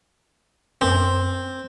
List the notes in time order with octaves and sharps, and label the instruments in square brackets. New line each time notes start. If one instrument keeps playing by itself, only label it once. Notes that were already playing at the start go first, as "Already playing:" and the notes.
[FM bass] F#2 [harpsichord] C4